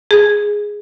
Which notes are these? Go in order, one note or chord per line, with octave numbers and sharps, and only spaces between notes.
G#4